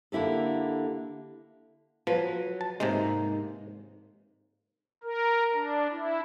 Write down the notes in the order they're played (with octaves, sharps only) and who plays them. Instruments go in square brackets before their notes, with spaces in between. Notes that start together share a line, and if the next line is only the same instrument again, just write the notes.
[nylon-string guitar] D3 A#3 E4 G4 A4
[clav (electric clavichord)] F3 [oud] F#3 [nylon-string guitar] B4
[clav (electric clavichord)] A5
[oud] G#2 A#3 D#4 [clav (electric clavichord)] C3 G#3
[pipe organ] A#4
D4
E4